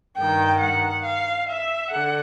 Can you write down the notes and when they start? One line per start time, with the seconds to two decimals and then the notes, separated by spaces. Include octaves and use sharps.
0.18 G2 D#3 G5
0.61 F#5
1.05 F5
1.49 E5
1.91 D3 F#5